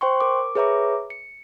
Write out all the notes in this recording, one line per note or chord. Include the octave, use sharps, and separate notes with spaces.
C5 G5 C6 C#6
A#4 D6
G#4 B4 C#5 E5 A#5 D6
C#7